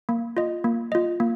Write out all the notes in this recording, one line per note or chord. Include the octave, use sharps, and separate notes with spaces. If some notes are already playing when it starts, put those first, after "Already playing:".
A#3
F4 D#5
A#3
F4 D#5
A#3